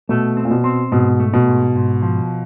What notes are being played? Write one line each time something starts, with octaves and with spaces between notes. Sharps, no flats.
B2 A3
C4
A#2
B2
C4
G#2 B2
A3
B2
G#2
G#2
F3